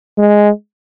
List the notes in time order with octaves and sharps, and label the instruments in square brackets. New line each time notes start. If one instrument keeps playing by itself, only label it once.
[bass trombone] G#3